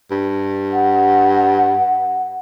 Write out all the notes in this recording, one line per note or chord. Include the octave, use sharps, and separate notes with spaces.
G2
F#5